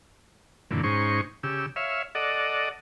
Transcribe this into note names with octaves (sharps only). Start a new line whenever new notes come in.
F#2 A#2 D3 E3
G#2 C#4 D#4 C5 C#6
C#3 G4 E6
C#5 E5 F5
A4 D5 D#5 F#5